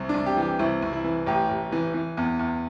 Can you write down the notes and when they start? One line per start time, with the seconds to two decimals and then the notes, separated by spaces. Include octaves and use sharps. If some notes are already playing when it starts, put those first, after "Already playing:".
Already playing: C2
0.09 D4
0.14 C2
0.26 G4
0.37 E3
0.42 G4
0.59 C2 E4
0.82 C2
0.93 E4
1.04 E3
1.26 A1 G4
1.49 A1
1.72 E3
1.94 E3
2.17 E2
2.39 E2